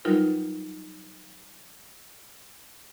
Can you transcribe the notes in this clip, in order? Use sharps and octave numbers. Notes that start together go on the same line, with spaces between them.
F#3 G3 D#4 F4 A#4 B4